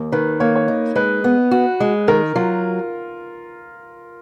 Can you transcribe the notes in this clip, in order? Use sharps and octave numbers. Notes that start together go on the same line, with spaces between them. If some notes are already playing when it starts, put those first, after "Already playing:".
Already playing: D#2
D#3 B4
A#3 C#5
C#5
D#4
G#3 B4
B3
F#4
G#3
D#3 A#4
F#3 F4